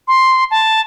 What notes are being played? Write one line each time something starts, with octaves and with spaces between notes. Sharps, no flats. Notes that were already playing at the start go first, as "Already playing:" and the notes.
C6
A5